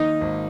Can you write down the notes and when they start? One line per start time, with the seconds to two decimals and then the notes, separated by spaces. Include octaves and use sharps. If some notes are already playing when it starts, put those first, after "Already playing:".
Already playing: D#3 A#3 D#4
0.21 G#1